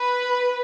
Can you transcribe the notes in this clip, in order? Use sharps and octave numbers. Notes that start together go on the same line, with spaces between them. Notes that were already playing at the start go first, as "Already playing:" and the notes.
Already playing: B4